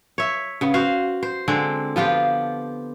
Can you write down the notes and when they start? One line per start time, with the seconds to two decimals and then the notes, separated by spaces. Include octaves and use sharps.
0.18 C#5 E5
0.61 C#3 B3
0.74 F#4 C5 F5
1.23 C5
1.48 D3 G#3 C4
1.96 F3 B3 F4 G4